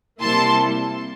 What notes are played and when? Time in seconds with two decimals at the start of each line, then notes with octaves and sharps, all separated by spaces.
0.21 C3 G3 A#3 E4 A5 C6